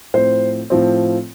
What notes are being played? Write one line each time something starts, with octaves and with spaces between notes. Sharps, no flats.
A2 F3 C4 C5
A2 F3 C4